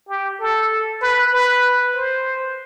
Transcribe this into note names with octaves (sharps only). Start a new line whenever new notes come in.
G4
A4
B4
B4
C5